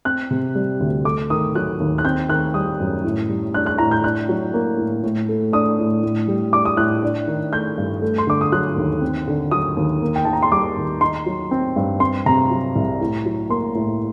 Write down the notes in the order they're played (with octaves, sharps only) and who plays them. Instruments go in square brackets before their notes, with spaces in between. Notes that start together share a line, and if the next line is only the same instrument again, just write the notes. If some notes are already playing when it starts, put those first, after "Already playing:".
[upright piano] C4 F#6
C3
G3
D2
A3 D6
D#3 D#6
F#3 F#6
D#2
F#6
C4 G6
D#3 F#6
G3 D#6
F#2
A2
G3
D4 F#6
F#6
A2 A#5
G6
D4 F#6
F#3
A#3
A2
A2
A3
D4 D#6
A2
A2
G3
D4 D6
D#6
A2 F#6
D4
D#3
A3 G6
G2
A3
C6
D3 D6
D#6
F#3 F#6
D#2
C4
D3
F#3 D#6
D#2
A#3
G5
D#3 A5
A#5
C6
G3 D6
D#2
D#4 C6
F#3
C4
G2
C4 C6
C3 A#5
F#3
C2
A2
F#3
A#3 C6
A2